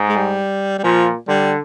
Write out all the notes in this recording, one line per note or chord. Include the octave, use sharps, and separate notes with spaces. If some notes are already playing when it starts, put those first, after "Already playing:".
Already playing: G#2
G#3
G3
G3
A#2 F3
D3 G3